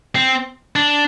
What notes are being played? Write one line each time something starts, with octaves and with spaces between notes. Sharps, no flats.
C4
D4